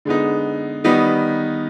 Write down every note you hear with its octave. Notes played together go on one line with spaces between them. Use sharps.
D3 G#3 B3 D#4
D#3 G3 B3 D#4